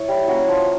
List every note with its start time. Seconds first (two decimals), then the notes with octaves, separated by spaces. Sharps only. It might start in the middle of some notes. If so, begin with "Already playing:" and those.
Already playing: E4 C#5
0.08 G3
0.28 A#3 C#4 F#4
0.48 F3